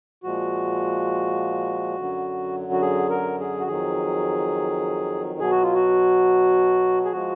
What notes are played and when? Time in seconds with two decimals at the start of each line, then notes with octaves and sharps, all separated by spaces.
0.23 A#2 F3 G#3 F#4
1.96 F#2 D3 F#3
2.72 F#4
2.82 G#4
3.10 A#4
3.40 G#4
3.60 F#4
3.67 F2 D#3 F#3 G#4
5.40 B2 F#3 G#4
5.52 F#4
5.63 F4
5.74 F#4
7.05 G#4
7.12 F3 G#3 F#4